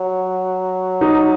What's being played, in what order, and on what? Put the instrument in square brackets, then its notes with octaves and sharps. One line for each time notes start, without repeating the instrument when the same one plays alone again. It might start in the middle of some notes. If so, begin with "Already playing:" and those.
Already playing: [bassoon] F#3
[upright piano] D#4